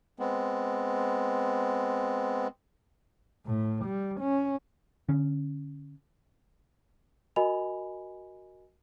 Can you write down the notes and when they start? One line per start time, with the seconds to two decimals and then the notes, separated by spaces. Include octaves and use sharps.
0.19 G#3 B3 C4
3.46 A2
3.85 G3
4.20 C#4
5.09 D3 C#4
7.36 F#4 A#4 D#5 G#5 B5 F7